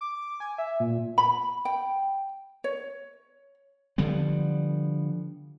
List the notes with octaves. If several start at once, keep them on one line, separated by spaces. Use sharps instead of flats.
D6
G#5
E5
A#2
B5
G5
C#5
D3 F3 G3 B3